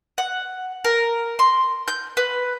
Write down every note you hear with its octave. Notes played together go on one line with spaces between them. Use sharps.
F#5
A#4
C6
G6
B4